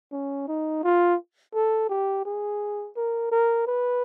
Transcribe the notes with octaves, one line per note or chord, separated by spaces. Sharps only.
C#4
D#4
F4
A4
G4
G#4
A#4
A#4
B4